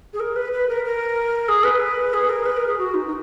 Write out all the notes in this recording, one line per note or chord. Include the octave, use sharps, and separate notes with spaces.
G#4
A#4
B4
B4
A#4
A#4
G#4
B4
G#4
A#4
B4
A#4
G#4
F#4
D#4
D#4